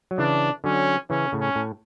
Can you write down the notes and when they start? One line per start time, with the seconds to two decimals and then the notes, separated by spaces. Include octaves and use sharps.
0.11 F#3
0.18 C#3 E3 D4
0.64 D3 F#3 C#4
1.10 C#3 E3 C#4
1.32 A2 C#3
1.41 C#4
1.56 A2